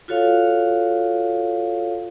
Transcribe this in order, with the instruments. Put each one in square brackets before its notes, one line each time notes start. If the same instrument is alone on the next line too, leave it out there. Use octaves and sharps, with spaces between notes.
[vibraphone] F4 F#4 A4 C#5 F5